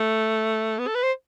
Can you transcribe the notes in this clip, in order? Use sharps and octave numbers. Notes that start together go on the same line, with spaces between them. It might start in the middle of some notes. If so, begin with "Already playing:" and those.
Already playing: A3
B3
A4
B4
C5